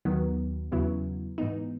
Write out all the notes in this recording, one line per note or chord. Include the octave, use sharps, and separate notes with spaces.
D#2 D#3 F#3 B3
E2 C#3 F#3 B3 E4
G#2 E3 B3 D#4